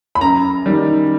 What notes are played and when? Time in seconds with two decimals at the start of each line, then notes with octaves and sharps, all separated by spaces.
0.15 B5
0.21 F#2 A#5
0.66 D#3 G3